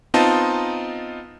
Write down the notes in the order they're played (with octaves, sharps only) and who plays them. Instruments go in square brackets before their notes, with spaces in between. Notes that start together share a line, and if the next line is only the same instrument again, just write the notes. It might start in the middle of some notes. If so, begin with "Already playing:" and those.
[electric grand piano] B3 C4 D#4 F4 D#5 A5